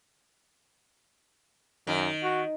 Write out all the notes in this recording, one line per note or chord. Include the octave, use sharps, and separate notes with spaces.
F#2 D#3
F#4